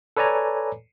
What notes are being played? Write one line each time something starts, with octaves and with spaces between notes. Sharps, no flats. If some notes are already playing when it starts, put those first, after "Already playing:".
A4 B4 C#5 D5 G#5 A#5